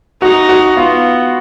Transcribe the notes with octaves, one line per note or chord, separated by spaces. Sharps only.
D#4 F#4
F#4
B3 F4